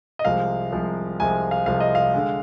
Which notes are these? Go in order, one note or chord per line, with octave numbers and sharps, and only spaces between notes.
D#5
C2 C3 F3 G#3 F5
C2 C3 F3 G#3
C2 C3 F3 G#3 G#5
F5
C2 C3 F3 G#3 F5
D#5
F5
D3 G#3